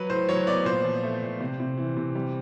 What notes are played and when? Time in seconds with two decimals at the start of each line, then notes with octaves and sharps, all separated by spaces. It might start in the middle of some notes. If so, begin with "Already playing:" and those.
Already playing: F#3 B4
0.10 A2 C5
0.29 F#3 C#5
0.47 B3 D5
0.65 A#2 C5
0.84 F3
1.03 A3
1.22 A#2
1.40 C3
1.60 C3
1.77 E3
1.97 C3
2.15 G3